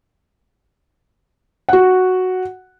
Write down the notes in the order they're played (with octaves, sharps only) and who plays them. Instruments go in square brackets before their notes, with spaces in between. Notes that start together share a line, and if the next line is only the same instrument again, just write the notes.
[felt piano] F#4 F#5